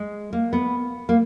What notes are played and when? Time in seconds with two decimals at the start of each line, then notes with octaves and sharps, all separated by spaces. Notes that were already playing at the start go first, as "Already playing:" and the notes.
Already playing: G#3
0.33 A#3
0.53 B3
1.09 A#3